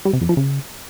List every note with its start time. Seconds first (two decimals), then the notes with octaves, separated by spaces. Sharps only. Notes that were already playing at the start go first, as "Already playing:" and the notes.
0.05 G3
0.13 C3
0.21 F2
0.29 F3
0.37 C#3